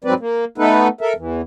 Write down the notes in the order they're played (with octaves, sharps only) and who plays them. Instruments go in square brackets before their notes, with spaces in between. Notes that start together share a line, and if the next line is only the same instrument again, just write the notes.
[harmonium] G#2 F#3 C4 B4 D5
A#3
A3 B3 D#4 A4 B4
A4 A#4 E5
E2 E3